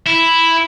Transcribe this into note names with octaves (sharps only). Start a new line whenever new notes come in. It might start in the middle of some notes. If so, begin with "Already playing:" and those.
E4